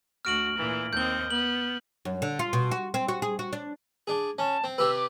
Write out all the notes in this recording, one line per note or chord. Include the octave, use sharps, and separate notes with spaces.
D2 F#4 F6 D7 F#7
A#2 E3
D#2 C4 D#5 G6 G7
B3 F#7
F#2
D3
F4
B2
F#4
C4
F#4
G#4
F#4
D4
D4 G#4
C#4 A5
C4
C3 G4 B4 E6
D6